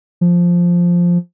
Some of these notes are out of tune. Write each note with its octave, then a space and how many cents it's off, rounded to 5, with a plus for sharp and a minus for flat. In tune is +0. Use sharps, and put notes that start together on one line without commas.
F3 +0